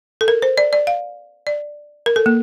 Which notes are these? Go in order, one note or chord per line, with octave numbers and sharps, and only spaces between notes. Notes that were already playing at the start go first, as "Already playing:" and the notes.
A4
A#4
C5
D5
D5
F5
D5
A#4
A4
A#3